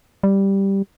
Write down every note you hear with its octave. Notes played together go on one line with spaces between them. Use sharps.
G3